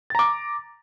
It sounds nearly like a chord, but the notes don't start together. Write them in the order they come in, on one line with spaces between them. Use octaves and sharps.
A6 A#5 D6